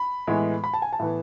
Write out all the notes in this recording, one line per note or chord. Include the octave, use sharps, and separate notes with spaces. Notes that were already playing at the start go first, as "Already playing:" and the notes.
Already playing: B5
A2 E3 G#3 B3
B5
A5
G#5
A5
A2 E3 B3